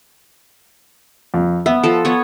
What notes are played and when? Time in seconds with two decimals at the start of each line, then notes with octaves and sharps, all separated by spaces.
1.34 F2
1.66 B3 E5
1.83 F3 A4
2.05 B3 C#5